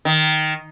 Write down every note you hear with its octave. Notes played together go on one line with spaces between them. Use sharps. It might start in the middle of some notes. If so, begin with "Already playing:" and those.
D#3